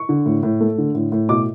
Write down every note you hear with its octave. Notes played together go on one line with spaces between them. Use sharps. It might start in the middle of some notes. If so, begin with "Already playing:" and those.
Already playing: C#6
D3
A2
A2
A3
D3
A2
A2
B2 D6